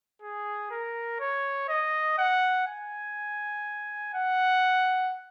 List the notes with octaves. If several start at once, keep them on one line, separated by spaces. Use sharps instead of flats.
G#4
A#4
C#5
D#5
F#5
G#5
F#5